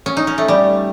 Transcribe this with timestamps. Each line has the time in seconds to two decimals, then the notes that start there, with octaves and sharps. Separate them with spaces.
0.06 C#4
0.17 D#4
0.27 C#4
0.38 A3
0.48 G3